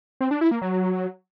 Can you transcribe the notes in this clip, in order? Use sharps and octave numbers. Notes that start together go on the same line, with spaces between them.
C4
D4
E4
A#3
F#3